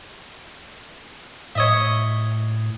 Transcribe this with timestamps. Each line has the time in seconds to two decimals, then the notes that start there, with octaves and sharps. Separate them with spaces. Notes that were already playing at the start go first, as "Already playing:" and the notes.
1.55 A2 C#5 D#5 E5